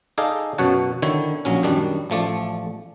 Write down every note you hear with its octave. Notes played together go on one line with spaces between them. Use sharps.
D#4 G#4 A4 D5 D#5 F5
F#2 B2 C#5 F#5 A5
D3 D#3 E4 C#5
A#1 F#3 C#4
F#2 D#3 G3 D4
A1 F3 A3 D5